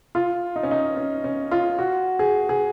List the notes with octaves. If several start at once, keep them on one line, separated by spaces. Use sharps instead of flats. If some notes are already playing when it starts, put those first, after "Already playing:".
F4
D#4
C#4
D#4
C#4
C#4
F4
F#4
G#4
G#4